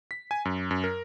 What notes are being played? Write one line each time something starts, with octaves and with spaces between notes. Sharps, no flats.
B6
G#5
F#2
F#2
A#4